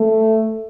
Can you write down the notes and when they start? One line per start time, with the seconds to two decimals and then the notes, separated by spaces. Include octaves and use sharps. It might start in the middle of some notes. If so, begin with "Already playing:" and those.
Already playing: A3